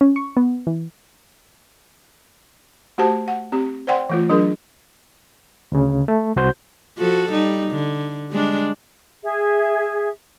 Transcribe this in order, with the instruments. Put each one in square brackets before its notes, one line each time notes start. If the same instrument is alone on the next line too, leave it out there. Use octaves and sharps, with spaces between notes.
[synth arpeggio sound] C#4
C#6
B3
E3
[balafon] A3 F#4 G4 C5 A5
F#5
C4 G4
C5 D5 F#5 G5 C6
E3 A3 F4
F#3 D4 G#4 A#4
[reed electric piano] D2 C#3
A3
C2 F#4 C5 G6
[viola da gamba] F3 F#4 A4
G3 D#4
D3
G3 G#3 D4
[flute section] G#4 E5